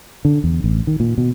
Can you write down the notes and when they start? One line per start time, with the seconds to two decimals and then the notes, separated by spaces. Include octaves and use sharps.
0.25 D3
0.44 E2
0.64 A1
0.87 D#3
1.00 A#2
1.18 B2